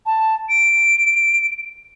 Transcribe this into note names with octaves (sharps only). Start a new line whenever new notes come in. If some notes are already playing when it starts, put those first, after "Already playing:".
A5
D7